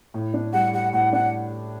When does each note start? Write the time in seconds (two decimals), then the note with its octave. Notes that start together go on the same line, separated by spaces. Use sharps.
0.14 A2
0.34 D4
0.53 G3 F#5
0.73 G4 F#5
0.93 A2 F#5
1.13 D4 F#5